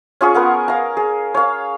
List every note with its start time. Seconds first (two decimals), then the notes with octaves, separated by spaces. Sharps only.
0.21 C#4 F4 G#4 C#6
0.34 B3 A#4 F#5
0.68 F5 A#5
0.97 G#4
1.34 C#5 F5